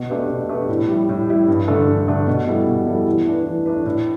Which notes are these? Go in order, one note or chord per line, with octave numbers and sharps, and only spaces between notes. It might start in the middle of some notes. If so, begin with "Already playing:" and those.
Already playing: B2
A3 D4 G4 B4
B2
A3 D4 G4 B4
A2
G3 E4
A2
G3 E4
G2
D3 A3 D4 A4
G2
D3 A3 D4 A4
B2
G3 E4 A4
B2
G3 E4 A4
E3
A3 D4 B4
E3
A3 D4 B4
A2